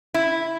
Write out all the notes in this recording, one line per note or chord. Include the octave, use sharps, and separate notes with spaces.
E4